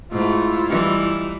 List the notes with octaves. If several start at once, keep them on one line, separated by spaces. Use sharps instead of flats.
G#2 A3 E4 F4
E3 G3 D#4